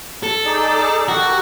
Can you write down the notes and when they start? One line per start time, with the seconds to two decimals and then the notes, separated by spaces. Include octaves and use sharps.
0.23 A4
0.45 D#4 G#4 D5
1.08 F#4 G4 A4 A#4